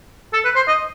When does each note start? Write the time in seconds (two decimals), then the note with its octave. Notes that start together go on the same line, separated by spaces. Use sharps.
0.33 A4
0.45 B4
0.56 C5
0.68 D#5